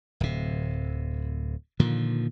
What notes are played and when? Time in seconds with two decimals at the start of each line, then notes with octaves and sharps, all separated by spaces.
0.20 D1 C3
1.80 A#2 D3 D#3 F3